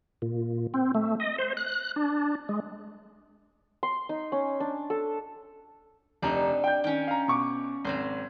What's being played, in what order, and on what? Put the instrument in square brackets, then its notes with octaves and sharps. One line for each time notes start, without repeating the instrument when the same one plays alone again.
[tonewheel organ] A#2
C4
A3
D#5
C5
F#6
D4
G#3
[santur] C6
D#4
C#4
D4
A4
[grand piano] F1 A#5 [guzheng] D4 D#4
[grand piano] G5 G6
[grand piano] D#3 [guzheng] C#4 G5
[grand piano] F5 A#5
B2 C#6 D6
[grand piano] G#1 [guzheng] F#3 C5 C6